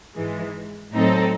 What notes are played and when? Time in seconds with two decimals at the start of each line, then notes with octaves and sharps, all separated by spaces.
0.15 G#2 E3 G#3
0.93 A2 F#3 C4 D#4 A4